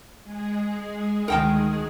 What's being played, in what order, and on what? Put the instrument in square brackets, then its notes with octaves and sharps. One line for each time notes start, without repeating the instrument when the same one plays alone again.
[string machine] G#3 G#4
[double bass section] D2 D#3 [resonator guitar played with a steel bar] A#4 G5 A5